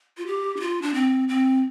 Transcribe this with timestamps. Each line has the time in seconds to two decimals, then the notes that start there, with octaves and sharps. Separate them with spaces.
0.18 F4
0.26 G4
0.57 D4
0.61 F4
0.82 D4
0.94 C4
1.29 C4